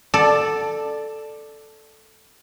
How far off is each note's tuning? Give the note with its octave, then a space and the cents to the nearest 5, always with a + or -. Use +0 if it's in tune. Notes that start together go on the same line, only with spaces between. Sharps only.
A4 +0 D5 +15